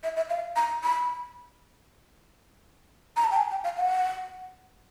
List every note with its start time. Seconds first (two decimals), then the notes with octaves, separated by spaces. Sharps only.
0.03 E5
0.17 E5
0.30 F5
0.56 A#5
0.83 B5
3.17 A#5
3.24 A5
3.31 G5
3.37 G#5
3.51 G5
3.64 F5
3.77 F#5